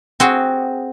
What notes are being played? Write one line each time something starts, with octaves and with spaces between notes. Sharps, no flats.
C4 F#4 G#4